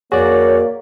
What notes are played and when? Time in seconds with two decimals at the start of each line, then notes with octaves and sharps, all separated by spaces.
0.12 F2 A#3 F#4 G#4 C#5 D5